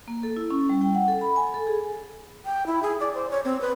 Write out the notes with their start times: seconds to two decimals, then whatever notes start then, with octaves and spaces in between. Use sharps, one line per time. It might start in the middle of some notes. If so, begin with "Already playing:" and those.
0.08 A#3
0.23 A4
0.37 E4
0.51 C#4
0.69 G3
0.81 G5
0.95 F#5
1.08 A4
1.21 B5
1.36 G#5
1.54 A4
1.67 G#4
2.46 G5
2.66 E4
2.83 G#4
3.00 D5
3.14 C5
3.31 C#5
3.45 C4
3.61 B4